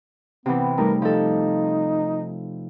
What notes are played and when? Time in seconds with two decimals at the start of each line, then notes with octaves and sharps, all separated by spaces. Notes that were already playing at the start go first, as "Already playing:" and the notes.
0.46 C3 E3 B3
0.78 G3 A3 D#4 A#4
1.02 F3 D#4 A4